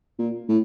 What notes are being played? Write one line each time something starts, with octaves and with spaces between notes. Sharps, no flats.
A#2
A2